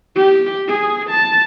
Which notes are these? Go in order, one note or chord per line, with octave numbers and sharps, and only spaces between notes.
G4
G#4
A5